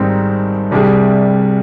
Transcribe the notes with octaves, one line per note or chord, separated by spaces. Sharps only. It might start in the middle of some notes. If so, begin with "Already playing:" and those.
Already playing: G#1 G#2 G3 C4 D#4
C2 C3 G3 D4 G#4